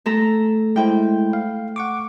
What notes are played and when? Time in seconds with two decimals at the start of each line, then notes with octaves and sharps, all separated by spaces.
0.06 A3 A4 A#5
0.76 G#3 E4 C5 G5
1.33 F5
1.76 F#5 C#6 D6